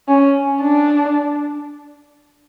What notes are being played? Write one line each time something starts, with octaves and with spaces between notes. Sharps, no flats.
C#4
D4